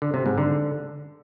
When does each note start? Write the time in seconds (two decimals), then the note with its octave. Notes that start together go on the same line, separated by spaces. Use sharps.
0.02 D3
0.14 C3
0.26 G#2
0.38 D3